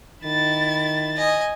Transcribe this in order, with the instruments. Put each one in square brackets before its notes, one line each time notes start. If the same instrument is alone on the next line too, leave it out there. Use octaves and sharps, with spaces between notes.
[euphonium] D#3 [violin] E4 A6
[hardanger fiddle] D#5 G#5